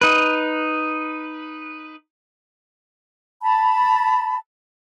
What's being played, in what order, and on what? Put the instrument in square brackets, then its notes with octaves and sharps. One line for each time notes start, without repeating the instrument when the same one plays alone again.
[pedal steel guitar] D#4 B4
[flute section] A5 B5